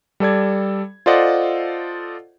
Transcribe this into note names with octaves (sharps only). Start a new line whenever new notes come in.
G3 A4 D5 G#6
F4 A4 C5 D5 D#5 F#5